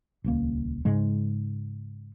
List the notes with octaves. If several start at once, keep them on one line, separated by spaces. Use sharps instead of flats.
D#1 C#2 A#3
G#2 C#3 G#3